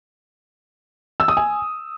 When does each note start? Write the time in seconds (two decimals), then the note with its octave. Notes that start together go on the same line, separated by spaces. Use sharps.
1.20 E6
1.28 D#6
1.37 G#5